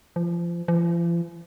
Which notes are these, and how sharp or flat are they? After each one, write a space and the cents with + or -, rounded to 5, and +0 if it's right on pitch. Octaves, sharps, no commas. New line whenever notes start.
F3 -30
F3 -45